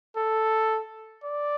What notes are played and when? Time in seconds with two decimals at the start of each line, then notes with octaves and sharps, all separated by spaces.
0.17 A4
1.24 D5